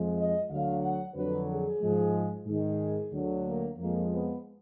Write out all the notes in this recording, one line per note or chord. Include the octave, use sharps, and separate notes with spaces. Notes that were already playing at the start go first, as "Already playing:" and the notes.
Already playing: F2 F3 G#3
D#5
D2 D3 F#3 F5
F#5
F2 D3 F#3 B4
G#4
G#2 F3 G#3
G#2 D#3 G#3 G#4
D2 D3 F#3
A#3
F2 F3 G#3 A#3
B3